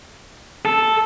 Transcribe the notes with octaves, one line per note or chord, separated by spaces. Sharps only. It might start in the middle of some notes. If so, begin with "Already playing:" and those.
A4